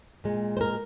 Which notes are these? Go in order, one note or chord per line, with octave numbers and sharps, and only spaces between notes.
A#2 G#3
C5
A#4